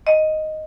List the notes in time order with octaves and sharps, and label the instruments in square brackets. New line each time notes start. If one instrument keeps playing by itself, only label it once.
[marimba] D#5